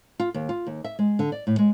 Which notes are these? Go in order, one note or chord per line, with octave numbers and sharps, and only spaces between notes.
F4
D#2
F4
D#2
E5
G#3
D3
D5
A2
G#3